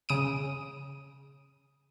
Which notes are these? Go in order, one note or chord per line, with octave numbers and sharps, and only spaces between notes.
C#3 D#6 D7